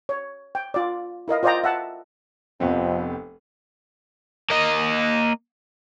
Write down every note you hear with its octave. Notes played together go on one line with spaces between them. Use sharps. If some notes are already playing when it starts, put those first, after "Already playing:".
C#5
G5
F4 D5
E4 A#4 D#5 F5
F4 C5 D5 D#5 G5 A#5
E5 F#5 A5
F1 F2 B3 C4
A#3 D#5